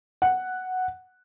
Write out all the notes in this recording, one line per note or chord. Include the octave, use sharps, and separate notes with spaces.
F#5